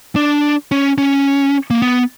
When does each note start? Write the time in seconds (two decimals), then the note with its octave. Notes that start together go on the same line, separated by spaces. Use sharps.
0.16 D4
0.71 C#4
0.98 C#4
1.70 A#3
1.82 B3